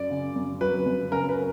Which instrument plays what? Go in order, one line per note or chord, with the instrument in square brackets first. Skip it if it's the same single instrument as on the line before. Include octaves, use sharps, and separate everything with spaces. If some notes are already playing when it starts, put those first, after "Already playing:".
Already playing: [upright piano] F#2 F#3 [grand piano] D5
[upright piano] C#3
F#2
[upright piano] F#3 [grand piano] B4
[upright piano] F#2
[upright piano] C#3 [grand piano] A#4
[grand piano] B4